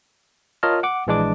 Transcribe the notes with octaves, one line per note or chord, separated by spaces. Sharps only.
F4 A#4 C#5 D#5 A5 F6
F#5 D6
A#1 E3 G#3 D4 D6